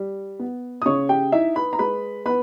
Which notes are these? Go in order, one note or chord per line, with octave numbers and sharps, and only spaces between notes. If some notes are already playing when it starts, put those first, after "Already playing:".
Already playing: G3
B3
D#6
C#3 C#5 C#6
G4 G5
D#4 E4 E5
B4 B5
A#5
G#3 B4 B5
B3 B4 B5